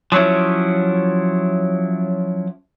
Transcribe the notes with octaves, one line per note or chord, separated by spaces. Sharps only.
F3 F#3 G#3 C#4 E4